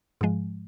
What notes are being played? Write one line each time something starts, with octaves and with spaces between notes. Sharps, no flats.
G#2 F3 G#3